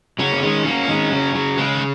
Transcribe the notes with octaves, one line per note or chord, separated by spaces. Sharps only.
C#3 F#3 C#4
A#3
D#3 G#3
F#3 A#3
D#3 G#3
C#3 F#3
C#3 F#3
C#3 G#3
D#3